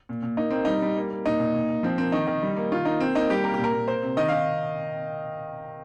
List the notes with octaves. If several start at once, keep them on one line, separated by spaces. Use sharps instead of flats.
A#2
A#2
A#3 D#4
A#3 C4
G3 D#4
G3
A#3
A#3
A#2 D#4
A#2
A#2
A#2
F3 C4
A#3 C4
D#3 D#4
D#3
G3
A#3
D#3 F4
A#3 D#4
A#3 C4
A#3 D#4
G3 G4
A#3 A#4
A#2 G4
A#4
A#2
A#3 C5
C3
D#3 D#5
D#3 F5